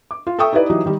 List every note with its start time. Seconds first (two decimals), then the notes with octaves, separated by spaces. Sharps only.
0.11 D6
0.27 F4
0.39 A4 E5 G5 C#6 D#6
0.53 D#4 E4 G4 B4 D5
0.70 E3 F#3 D#4 G4
0.86 D#3 G3 D#4